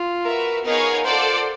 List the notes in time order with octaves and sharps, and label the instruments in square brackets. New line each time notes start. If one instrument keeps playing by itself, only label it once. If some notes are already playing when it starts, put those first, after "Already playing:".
Already playing: [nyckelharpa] F4
[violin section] F#4 B4 E5 [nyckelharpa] A#4
[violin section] B3 D#4 G#4 C#5 F5 [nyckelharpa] A#4
[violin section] F4 A4 D5 F#5 [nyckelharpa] C5